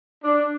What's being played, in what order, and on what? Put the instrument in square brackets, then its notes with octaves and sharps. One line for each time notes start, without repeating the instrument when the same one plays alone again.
[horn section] D4